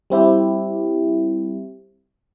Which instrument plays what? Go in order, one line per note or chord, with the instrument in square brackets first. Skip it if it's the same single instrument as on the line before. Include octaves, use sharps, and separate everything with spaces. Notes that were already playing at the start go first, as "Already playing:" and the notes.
[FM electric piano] G3 C4 E4 G4